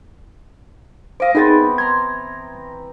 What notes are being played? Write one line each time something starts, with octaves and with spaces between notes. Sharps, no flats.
C5 D#5 F5 D6
E3 B3 C4 D#4 G#4 A6
A#5 C6 G#6